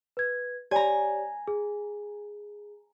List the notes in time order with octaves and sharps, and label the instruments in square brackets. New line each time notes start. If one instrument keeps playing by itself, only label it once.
[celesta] B4 G#6
[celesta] G4 C#5 D5 [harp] G#5 A#5
[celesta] G#4